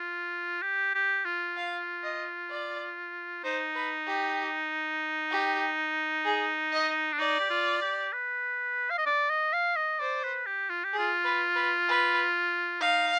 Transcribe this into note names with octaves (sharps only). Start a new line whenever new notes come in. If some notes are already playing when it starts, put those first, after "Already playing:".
Already playing: F4
G4
G4
F4
F5
D#5
D5
D#4 C5
B4
G4
G4
G#4
D#5
D4
D#4 D5
G4
F4
G4
B4
F5
D#5
D5
D#5
F5
D#5
C5 D5
B4
G4
F4
G4
G#4
F4
B4
B4
B4
D#4 F5